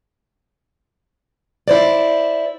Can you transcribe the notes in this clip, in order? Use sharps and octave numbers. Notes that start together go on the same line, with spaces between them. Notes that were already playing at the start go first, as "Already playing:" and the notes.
E4 C5 D5